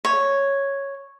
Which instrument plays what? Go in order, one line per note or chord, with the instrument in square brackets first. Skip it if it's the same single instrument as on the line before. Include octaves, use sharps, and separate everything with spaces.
[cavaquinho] C#5